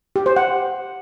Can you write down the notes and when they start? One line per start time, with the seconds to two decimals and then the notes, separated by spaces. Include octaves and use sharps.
0.16 G4
0.26 C5
0.36 F#5